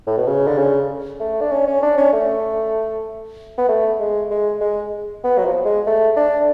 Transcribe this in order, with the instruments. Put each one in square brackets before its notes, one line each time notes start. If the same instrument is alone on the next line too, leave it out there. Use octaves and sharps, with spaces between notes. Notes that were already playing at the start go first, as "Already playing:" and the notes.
[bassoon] A2
B2
C#3
D3
C#3
A3
D4
C#4
C#4
D4
C#4
A3
B3
A3
G#3
G#3
G#3
B3
F#3
F3
G#3
A3
D4